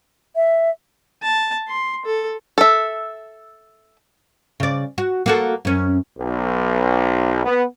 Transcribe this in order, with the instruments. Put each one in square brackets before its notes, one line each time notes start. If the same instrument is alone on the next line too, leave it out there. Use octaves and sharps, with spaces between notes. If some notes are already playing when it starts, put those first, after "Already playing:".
[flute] E5
[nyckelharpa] A5
C6
A4
[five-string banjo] A4 E5
[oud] C#3 D5
F#4
A#3 F#4 A4
F#2 C#4
[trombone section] B1
B3